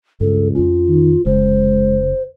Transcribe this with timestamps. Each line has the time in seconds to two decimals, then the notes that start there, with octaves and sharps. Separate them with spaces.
0.21 C#2 G2 A4
0.55 F2 C#4 F4
0.88 D#3
1.26 F1 C#3 G#3 C5